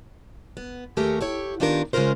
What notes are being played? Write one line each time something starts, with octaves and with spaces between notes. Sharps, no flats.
B3
D#2 A3 G4 G#4 A#4 C#5
E4 G4 C#5
D#3 B3 D4 F4 G4 A#4
C#3 G#3 C#4 F4 A#4 C5